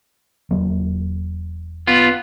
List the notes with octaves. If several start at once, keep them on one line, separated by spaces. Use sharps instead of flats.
E1 F#3 A#3
B3 F4